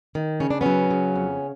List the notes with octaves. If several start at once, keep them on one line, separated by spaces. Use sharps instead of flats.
D#3
C#3 C#4
D4
F#3 B3 C#4
C#3
F2